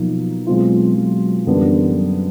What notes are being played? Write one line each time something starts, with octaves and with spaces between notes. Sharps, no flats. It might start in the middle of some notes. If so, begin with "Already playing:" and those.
Already playing: B2 F3 F#3 A#3 D#4
B2 F#3 G#3 C4 F4
F#3
F#2 D3 E3 G3 B3 D4
F#3